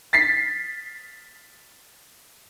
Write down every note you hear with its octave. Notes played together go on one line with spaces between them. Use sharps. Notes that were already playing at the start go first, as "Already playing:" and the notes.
A6 B6 C7